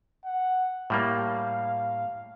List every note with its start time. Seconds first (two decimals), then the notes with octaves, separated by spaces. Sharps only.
0.25 F#5
0.90 A2 G3 A#3 F5